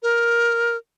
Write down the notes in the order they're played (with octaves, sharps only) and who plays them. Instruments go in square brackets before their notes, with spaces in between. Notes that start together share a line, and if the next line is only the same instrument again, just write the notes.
[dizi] A#4